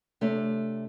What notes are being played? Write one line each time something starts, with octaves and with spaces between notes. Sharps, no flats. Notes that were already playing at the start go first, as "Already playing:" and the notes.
C3 A3 D4 C#5